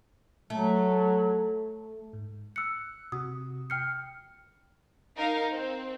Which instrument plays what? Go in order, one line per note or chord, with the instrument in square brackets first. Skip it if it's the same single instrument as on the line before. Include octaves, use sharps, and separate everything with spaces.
[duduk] F#3 [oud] A3
[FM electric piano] G#2
[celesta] E6 C#7 [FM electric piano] F#6
[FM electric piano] C3 F#4 [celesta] D#6
[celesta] G5 F6 C#7 [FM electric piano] G6 C7
[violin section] D#4 A#4 F5
C4